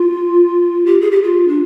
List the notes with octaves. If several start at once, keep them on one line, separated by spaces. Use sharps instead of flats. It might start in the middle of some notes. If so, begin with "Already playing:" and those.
Already playing: F4
G4
G#4
G4
F4
D4